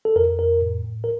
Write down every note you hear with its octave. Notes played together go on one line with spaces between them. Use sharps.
A4
F2 A#4
F2 A#4
A2
A2
A#4